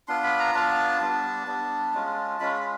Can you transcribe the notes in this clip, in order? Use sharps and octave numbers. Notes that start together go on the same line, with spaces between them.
B3 D4 F4 C6
B5
A#5
B3 D4 F4 A5
G3 B3 D4
G3 B3 D4
G#3 C#4 F4
G#3 C#4 F4 B5
B5